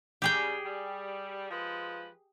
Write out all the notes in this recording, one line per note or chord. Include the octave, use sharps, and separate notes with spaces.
C#3 G3 G4 G#4 G5
G3
F3 G#3 B4